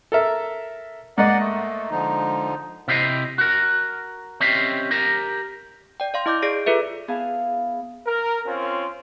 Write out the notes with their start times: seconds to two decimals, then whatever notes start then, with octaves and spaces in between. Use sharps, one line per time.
0.12 A4 A#4 E5
1.18 G#2 A#3 D5 D#5 F#5
1.39 A3
1.91 D3 F3 D#4
2.88 C3 E4 G4 C5 C#5 D#5
3.38 F#4 A#4
4.40 C4 C#4 G4 C5 D#5 E5
4.91 G4 A#4
6.00 D5 G5
6.14 D5 F5 C6
6.26 E4 D#5 D6 F6 G6
6.42 G#4 D5 A#6 C7 D7
6.66 F4 A4 B4 E5
7.08 B3 E4 G#4 F5 A5
8.05 A#4
8.45 C4 C#4 F4